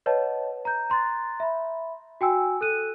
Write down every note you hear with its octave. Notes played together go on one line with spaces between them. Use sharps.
B4 C#5 D#5 F#5 A5
A#5 G6
A#5 C6 F#6 A6
E5 B5
F#4 G5 G#5 E6
A4 F#6 D#7